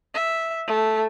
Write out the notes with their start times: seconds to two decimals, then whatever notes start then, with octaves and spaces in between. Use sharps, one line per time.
0.15 E5
0.67 A3